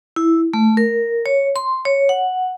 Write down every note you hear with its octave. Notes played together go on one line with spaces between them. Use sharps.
E4
A3
A#4
C#5
C6
C#5
F#5